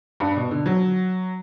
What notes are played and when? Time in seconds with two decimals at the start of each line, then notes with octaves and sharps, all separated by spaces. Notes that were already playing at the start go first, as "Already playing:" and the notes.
0.20 G2
0.37 B2
0.51 D3
0.66 F#3